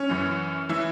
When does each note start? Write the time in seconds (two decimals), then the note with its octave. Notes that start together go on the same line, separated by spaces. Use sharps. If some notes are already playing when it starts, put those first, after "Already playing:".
Already playing: C#4
0.09 F#2 E3
0.69 E3 E4